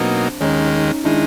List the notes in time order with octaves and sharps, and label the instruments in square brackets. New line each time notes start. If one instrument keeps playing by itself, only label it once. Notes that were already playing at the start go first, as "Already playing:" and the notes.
Already playing: [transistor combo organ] B2 F#3 A#3 D#4 [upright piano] C4 D4
[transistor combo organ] D#2 D#3 G#3 [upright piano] C#4 D#4
[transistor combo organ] D#3 G#3 [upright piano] D4 E4